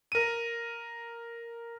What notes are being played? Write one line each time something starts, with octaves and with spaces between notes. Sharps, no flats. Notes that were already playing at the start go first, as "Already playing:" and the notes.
A#4 D#7